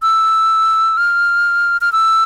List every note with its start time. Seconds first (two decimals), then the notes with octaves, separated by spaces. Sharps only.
0.02 E6
0.97 F6
1.81 F6
1.93 E6